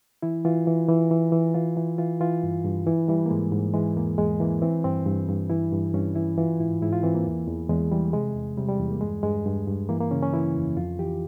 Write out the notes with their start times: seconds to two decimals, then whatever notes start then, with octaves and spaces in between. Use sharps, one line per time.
0.22 E3 E4
0.45 E3 F4
0.67 E3
0.88 E3
1.11 E3
1.32 E3
1.54 E3 F4
1.77 E3
1.98 E3 F4
2.21 E3 F4
2.43 G2
2.65 G2
2.86 E3 E4
3.08 E3 G3
3.26 A#3
3.30 G#2 G#3
3.52 G#2
3.74 E3 G#3
3.96 E2 A#3
4.18 E2 G#3
4.40 E3 A#3
4.62 E3 C4
4.84 G2 C4
5.06 G2
5.28 G2
5.50 E3 E4
5.72 G2
5.94 G2 C#4
6.15 E3 E4
6.38 E3 F4
6.60 G#2 E4
6.82 G#2 E4
6.92 F4
7.03 E3 C4
7.15 A#3
7.26 E2
7.47 E2
7.69 E2 G#3
7.92 E3 G3
8.13 C3 G#3
8.35 E2
8.57 C3 G3
8.69 G3
8.79 E2
8.91 A#3
9.01 G2 G#3
9.23 G2 G#3
9.46 G2
9.67 G2
9.89 E3 A#3
10.01 A#3
10.11 C#3 C#4
10.22 C#4
10.33 E3 E4
10.55 F2
10.77 F2 F4
10.99 E3 G4